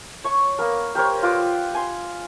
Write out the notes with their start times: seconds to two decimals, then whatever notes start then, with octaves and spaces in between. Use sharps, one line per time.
0.24 C#5 C#6
0.59 A#3 B3 A#4
0.95 G4 A#4 C5 C#5
1.23 F4 B4 D6 E6
1.74 G#5 C6